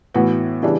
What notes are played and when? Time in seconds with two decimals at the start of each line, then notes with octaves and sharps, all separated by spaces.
0.14 A2 E3 B3 F#4 B4
0.63 C#3 E3 G3 D4